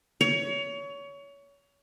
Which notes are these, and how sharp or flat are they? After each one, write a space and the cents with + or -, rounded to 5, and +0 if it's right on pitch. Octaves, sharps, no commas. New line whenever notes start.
C#5 +25